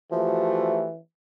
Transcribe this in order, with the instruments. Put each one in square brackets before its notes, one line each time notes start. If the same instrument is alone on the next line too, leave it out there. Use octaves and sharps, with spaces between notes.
[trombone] E3 [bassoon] F3 [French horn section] A3 F#4 G4